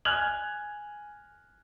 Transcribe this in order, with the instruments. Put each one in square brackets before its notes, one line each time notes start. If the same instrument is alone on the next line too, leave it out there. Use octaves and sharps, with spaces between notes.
[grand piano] G#5 F6 F#6 G#6 F7 F#7